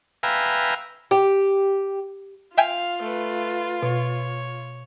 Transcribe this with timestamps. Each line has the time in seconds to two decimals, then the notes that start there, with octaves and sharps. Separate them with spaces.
0.23 B4 E5 F5 G5 G#5 A#5
1.11 G4
2.57 F4 E5 F5 G5 G#5
3.02 A3 B4
3.83 B2 C#5